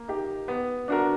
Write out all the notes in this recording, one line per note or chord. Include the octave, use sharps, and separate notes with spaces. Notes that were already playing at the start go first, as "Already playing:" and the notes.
Already playing: A#3
D#4 G4
B3
D4 F#4 A#4